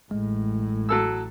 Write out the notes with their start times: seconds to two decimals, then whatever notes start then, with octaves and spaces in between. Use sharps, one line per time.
0.11 A1 A2 G#3
0.89 F#3 A4 E6